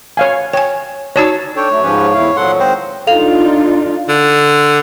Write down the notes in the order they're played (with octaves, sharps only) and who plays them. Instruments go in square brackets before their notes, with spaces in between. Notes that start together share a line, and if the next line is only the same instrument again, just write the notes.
[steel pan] C#5 F5 G#5
[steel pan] C#5 [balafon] G5 G#5
[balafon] D#4 F#4 D5 [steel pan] C#5 A5 E6
[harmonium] D4 A4 G5 [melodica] C#5
[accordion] F#3 [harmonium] A3
[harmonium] G#2 F3 [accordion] C#4 G4 B4
[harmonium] E2 E4 F5 [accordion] A3
[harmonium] A#2 A4 [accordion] F3 F#3 [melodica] F#5 C6
[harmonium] D#3 G#3 D#5 [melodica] C4 C5
[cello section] D4 D#4 F4 [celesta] A4 F5 F7
[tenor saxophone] D3